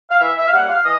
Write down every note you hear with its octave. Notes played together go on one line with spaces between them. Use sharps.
F5
E3 E5
E5
F5
G3 A#3 C#4 F#5
F5
E3 D#5